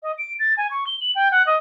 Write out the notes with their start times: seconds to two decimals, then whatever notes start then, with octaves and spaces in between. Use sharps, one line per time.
0.03 D#5
0.18 D7
0.39 A6
0.57 G#5
0.71 C#6
0.87 G7
1.01 F#7
1.15 G5
1.31 F#5
1.47 D#5